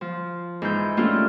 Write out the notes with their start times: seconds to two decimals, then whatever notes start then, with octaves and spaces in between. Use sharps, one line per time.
0.01 F3
0.62 G#2 E3 G6
0.97 A3 A#3 C#4 D4 F4 G4